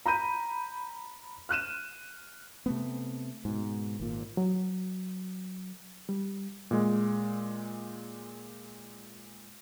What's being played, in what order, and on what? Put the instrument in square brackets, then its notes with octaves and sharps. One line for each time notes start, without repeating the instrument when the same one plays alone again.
[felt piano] A#5 B5 G6 D#7
F6 F#6 D#7 E7
[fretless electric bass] C3 A3 B3
G#2 B2
G#1 A#2
[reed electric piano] F#3
G3
[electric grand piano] A#2 G#3